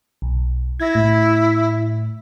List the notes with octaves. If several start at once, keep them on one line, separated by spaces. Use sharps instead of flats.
B1
E4 G#6 A#6
A2